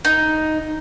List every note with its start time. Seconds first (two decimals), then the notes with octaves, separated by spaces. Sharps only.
0.05 D#4